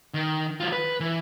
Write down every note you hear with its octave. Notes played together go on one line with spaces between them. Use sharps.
D#3
F#3 F4
B4
E3